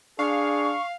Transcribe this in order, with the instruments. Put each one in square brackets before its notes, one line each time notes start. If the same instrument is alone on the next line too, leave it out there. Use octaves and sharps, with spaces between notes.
[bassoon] D4 [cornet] G#4 [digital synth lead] F5 [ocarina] C#6